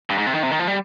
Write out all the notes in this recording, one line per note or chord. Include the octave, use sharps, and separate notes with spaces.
G2
G#2
C3
D#3
C3
D#3
F3
G3